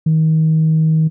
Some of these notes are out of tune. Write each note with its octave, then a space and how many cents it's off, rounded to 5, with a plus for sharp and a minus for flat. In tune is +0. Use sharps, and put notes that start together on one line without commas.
D#3 +30